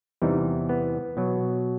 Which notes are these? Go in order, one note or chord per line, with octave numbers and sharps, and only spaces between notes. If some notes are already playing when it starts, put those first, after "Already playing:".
E2 C3 E3 G3 D#4
B3
B2 F#3